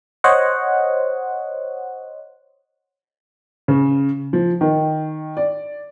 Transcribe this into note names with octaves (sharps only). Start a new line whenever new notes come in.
C5 C#5 D#5 F#5
C#3
F3
D#3
D5